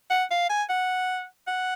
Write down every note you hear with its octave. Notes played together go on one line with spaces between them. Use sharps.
F#5
F5
G#5
F#5
F#5